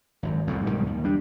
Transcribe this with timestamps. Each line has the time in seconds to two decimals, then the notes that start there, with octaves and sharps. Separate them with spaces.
0.23 G#1 F#2
0.47 C2 F2 A2
0.66 B1 G#2 D#3 G3
0.87 D#2
1.04 G3 D4